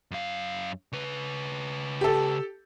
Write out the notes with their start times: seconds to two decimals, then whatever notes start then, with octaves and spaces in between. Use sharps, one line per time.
0.11 F#2 F5
0.92 C#3 B4
2.01 G4 A4